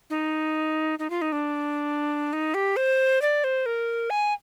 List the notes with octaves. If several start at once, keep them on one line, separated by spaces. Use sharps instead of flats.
D#4
D#4
F4
D#4
D4
D#4
G4
C5
D5
C5
A#4
G#5